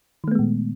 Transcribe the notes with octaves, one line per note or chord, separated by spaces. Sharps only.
A#2 D#3 G#3 A3 B3